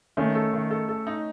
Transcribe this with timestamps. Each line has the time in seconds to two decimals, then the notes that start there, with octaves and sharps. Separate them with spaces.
0.17 D#3 A3 C#4
0.35 A4
0.53 D#3
0.71 A4
0.88 A4
1.07 D#4